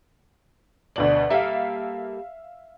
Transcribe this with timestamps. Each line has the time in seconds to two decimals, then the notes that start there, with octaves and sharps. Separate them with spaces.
0.96 D2 B2 D5 F#7
1.31 G3 A#3 A4 E5 F5